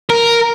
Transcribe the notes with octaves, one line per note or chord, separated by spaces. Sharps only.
A#4